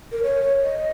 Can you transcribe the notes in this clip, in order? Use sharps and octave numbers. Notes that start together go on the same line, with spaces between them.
A#4
C#5
D#5